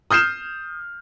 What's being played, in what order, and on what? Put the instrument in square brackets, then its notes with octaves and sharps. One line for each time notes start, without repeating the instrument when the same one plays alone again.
[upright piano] D#6 F6 G6 C7 E7